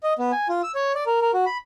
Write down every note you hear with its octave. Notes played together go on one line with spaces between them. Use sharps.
D#5
B3
G#5
F4
E6
C#5
D5
A#4
A#4
F#4
B5